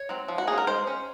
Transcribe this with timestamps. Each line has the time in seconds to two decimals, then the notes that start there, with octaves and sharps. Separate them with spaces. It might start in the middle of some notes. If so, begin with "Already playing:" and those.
Already playing: C#5
0.09 F#3 C4
0.28 F3
0.38 F#4
0.47 A#3 C#4 G#4
0.58 A#4
0.67 G#3 C5
0.87 C#4